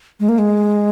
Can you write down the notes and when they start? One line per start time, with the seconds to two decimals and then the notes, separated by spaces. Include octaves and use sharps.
0.20 G#3
0.29 A#3
0.38 G#3